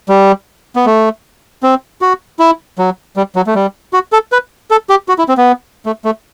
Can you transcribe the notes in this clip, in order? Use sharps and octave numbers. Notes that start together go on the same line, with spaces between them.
G3
B3
A3
C4
F#4
E4
F#3
G3
F#3
A3
G3
F#4
A4
B4
A4
G4
F#4
E4
C4
B3
A3
A3